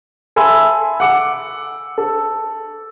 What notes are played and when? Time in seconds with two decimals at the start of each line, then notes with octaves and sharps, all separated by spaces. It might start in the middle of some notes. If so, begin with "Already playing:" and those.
0.36 A4 E5 G#5 B5 C6 E6
1.00 F#5 D6 C#7
1.98 A4